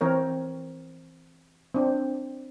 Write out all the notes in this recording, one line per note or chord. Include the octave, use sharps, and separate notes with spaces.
E3 C4 A#4 C#5
C4 D4